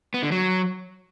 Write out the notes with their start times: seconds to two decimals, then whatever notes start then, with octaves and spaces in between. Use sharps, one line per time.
0.14 B3
0.23 D3
0.32 F#3